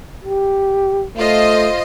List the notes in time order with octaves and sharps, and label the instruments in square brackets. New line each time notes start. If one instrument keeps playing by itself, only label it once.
[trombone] G4
[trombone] A3 [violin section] F4 C5 D#5